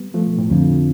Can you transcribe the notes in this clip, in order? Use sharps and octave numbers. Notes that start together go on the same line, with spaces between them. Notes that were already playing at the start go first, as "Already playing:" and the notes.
Already playing: G3 B3
F3 A3
B2
A2
F2 D3 F3